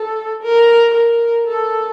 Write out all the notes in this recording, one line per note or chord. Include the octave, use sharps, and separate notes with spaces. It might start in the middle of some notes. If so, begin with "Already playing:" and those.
Already playing: A4
A#4
A#4
A4